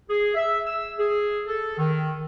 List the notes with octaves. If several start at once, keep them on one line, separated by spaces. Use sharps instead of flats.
G#4
E5
E6
G#4
A4
D#3